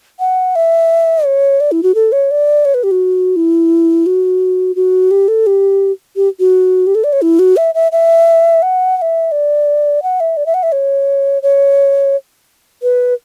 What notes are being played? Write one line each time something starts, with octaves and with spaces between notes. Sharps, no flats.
F#5
E5
C#5
D5
E4
F#4
A4
C#5
D5
C#5
B4
G4
F#4
E4
F#4
F#4
G4
A4
G4
G4
F#4
G4
A4
D5
C#5
E4
F#4
E5
E5
E5
F#5
F#5
E5
D5
F#5
E5
D5
E5
F#5
E5
C#5
C#5
B4